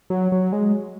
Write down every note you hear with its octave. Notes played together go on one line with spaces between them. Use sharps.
F#3
F#3
G#3